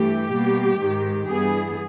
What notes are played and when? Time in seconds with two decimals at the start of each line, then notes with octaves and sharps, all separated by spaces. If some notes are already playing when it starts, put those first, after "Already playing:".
Already playing: G2 E3 A3 G4
0.32 B2 G3 A#3
0.79 G#2 D#3 G#3
1.27 G2 E3 G3 B3 G#4